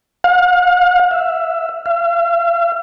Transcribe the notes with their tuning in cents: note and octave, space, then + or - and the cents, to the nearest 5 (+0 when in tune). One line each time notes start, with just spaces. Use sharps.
F5 +45
E5 +15
F5 -45